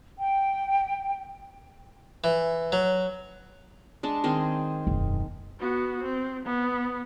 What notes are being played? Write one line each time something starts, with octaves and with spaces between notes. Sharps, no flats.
G5
E3
F#3
G#3 D4 A5
D#3 C4 G#4
E1 F#2
B3 F#4
C4
B3